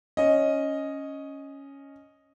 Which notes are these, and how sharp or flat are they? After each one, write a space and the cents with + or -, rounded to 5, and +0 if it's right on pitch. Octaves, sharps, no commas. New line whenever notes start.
C#4 +0 D#5 +0